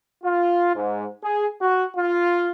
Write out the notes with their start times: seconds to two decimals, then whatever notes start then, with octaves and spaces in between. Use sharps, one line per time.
0.24 F4
0.76 G#2
1.23 G#4
1.61 F#4
1.97 F4